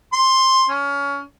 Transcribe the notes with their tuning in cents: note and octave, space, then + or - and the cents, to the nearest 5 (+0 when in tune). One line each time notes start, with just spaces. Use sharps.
C6 +10
C#4 +25